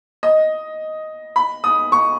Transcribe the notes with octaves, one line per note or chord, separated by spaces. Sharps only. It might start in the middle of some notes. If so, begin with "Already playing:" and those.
D#5
B5
D#6
C#6